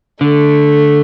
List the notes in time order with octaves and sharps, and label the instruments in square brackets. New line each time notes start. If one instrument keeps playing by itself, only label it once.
[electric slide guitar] D3 [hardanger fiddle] A3